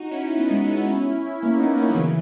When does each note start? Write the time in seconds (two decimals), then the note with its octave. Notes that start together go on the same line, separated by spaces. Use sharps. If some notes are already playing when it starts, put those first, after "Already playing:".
Already playing: D#4 F#4
0.11 C#4 E4
0.29 E4
0.37 B3 D#4
0.50 G#3 B3
0.64 B3 D#4
0.76 C#4 E4
1.42 A#3 C#4
1.59 B3 D#4
1.77 A#3 C#4
1.90 F#3
1.95 C#3 E3